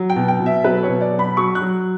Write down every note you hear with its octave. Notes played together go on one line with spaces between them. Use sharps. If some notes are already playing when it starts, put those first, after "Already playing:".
Already playing: F#3
G5
B2
G5
B2
E5
F#3 B4
C#5
B2
D5
F#3
B5
F#3 C#6
F#6
F#3